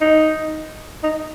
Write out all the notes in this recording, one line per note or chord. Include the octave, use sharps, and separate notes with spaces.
D#4
D#4